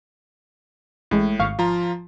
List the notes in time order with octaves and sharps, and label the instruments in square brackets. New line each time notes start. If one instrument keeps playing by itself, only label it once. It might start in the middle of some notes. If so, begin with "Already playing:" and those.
[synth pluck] A1 G#3 [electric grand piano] A2
[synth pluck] G#1 F5 C#6
[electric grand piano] F3 F4 A#5